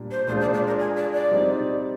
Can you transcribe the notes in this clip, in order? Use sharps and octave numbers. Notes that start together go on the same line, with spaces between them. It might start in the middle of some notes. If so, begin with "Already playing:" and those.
Already playing: A#2 G3 A#3 D4
C5
A#2 G#3 D4 F4 C5
D5
D5
A#4
G#4
D5
D5
G3 C4 D#4